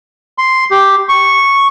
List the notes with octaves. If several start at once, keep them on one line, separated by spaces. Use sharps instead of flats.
C6
G4
C#6